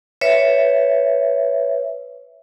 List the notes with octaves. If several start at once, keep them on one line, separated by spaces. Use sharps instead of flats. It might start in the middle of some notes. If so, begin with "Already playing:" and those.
B4 C#5 E5